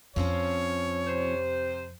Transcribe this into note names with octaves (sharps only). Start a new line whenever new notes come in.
F2 F3 C4 C#4 C#5
C3 C5